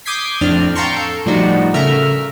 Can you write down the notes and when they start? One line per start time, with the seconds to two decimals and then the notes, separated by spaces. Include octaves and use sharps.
0.06 D6 D#6 G6 G#6 B6 C7
0.41 F2 A2 C4 D4 D5 F6
0.75 F5 G5 A5 A#5 C6 C#6
0.96 A4
1.26 A2 F3 G3 D4 D#4 F#4
1.74 C#3 A3 A#4 E5 A#5 F6